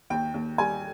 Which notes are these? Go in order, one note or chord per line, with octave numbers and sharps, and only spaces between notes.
D#2 G5
D#2
G3 G#5